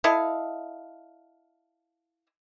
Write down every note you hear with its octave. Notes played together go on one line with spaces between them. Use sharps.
E4 A4 D#5 F5